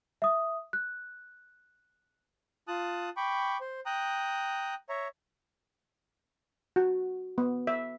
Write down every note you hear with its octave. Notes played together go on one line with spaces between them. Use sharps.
E5 D#6
F#6
F4 A5 D#6 F#6
G5 B5 C#6 D6
C5
G5 A#5 D#6 F#6
C#5 E5 A#5
F#4
B3
E5